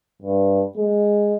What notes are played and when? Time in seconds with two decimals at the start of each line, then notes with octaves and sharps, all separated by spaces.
0.22 G2
0.77 G#3